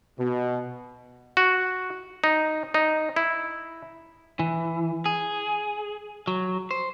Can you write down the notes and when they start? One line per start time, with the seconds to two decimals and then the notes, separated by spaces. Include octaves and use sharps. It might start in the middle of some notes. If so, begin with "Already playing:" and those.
0.18 B2
1.37 F#4
2.24 D#4
2.74 D#4
3.16 E4
4.40 E3
5.06 G#4
6.27 F#3
6.71 C5